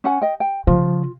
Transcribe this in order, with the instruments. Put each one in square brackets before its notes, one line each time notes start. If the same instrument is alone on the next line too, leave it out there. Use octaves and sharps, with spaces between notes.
[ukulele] C#4 F#5 G#5
D#5 G5
G5
[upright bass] C#3 [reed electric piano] F3 [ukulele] F4